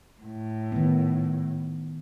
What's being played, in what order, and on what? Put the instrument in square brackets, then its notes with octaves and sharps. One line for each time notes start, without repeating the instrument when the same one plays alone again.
[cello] A2
[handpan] D#3 B3